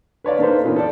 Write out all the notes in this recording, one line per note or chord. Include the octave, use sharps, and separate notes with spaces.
B4 C#5 D5 F5
A#3 D4 D#4 A4 B4 C5
A#2 E3 A#3 B3 C#4
A4 D5